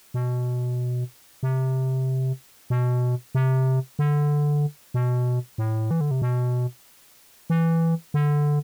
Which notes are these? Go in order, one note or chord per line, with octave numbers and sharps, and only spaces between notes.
B2
C3
B2
C3
D3
B2
A2
E3
D3
C3
B2
E3
D3